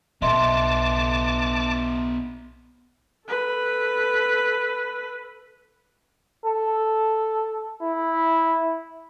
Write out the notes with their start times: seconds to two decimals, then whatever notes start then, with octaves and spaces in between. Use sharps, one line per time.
0.22 B1 B3 A4 D#5 E5 A5 C6 D6
3.28 A4 B4
6.45 A4
7.81 E4